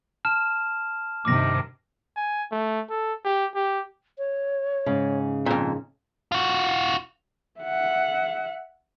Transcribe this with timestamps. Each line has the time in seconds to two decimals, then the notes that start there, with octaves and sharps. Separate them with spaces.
0.25 A5 F6 E7
1.25 G2 C3 D#3 D6 A#6
2.17 G#5
2.52 A3
2.90 A4
3.25 G4
3.55 G4
4.18 C#5
4.86 G#2 C#3
5.46 F2 A#2
6.32 F4 F#4
7.60 E5 F#5